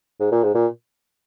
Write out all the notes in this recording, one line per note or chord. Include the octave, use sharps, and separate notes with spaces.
G#2
A#2
G#2
A#2